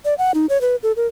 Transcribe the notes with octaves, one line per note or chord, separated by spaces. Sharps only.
D5
F#5
D#4
C#5
B4
A4
A#4